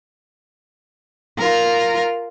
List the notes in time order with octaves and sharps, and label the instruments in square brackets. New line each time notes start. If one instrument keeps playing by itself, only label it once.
[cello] F4 A#4